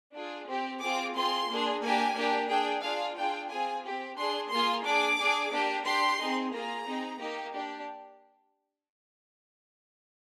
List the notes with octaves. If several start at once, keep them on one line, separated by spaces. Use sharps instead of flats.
D4 F4 G#4
C4 G4
C4 F4 G#4 D6
C4 F4 G#4 C6
A#3 D4 G#4
A#3 D4 G4 G#5
A#3 D4 G4
D4 G#4 G5
D4 F4 G#4 F5
D4 F4 G#4 G5
C4 F4 G#4 G#5
C4 G4
D4 G#4 C6
A#3 F4 G#4 C6
D4 G#4 D6
D4 G#4
A#3 D4 G4
D4 G4 C6
C4 D#4 G#4
A#3 F4 G#4 A#5
C4 D#4 G#4
A#3 D#4 G4
D4 G4